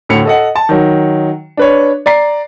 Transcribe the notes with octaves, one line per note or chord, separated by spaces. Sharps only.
D2 A2 C#7 F7
A4 D#5 F#5
A5
D#3 F#3
D4 B4 C#5
D5 A#5 C7